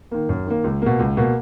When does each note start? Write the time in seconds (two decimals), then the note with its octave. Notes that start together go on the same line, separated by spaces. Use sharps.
0.12 D#3 A#3
0.29 F#2
0.46 D#3 A#3
0.64 C#2
0.82 B2 A#3
0.99 C#2
1.17 B2 A#3